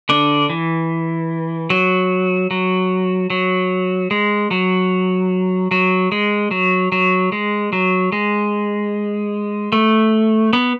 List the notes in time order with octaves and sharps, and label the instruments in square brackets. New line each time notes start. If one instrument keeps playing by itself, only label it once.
[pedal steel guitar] D3 D4
E3
F#3
F#3
F#3
G#3
F#3
F#3
G#3
F#3
F#3
G#3
F#3
G#3
A3
B3